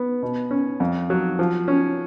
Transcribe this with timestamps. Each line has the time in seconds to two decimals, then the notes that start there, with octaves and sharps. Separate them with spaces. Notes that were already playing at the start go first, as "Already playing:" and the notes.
Already playing: B3
0.23 B2
0.51 C#4
0.80 F2
1.10 F#3
1.39 F3
1.68 C#4